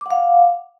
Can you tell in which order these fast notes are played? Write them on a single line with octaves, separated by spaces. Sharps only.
D6 F#5 F5